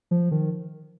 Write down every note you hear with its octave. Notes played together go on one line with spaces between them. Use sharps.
F3
D#3